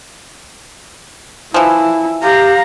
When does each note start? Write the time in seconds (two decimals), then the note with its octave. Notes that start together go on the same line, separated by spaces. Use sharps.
1.54 E3 F3 E4
2.23 G4 F5 A#5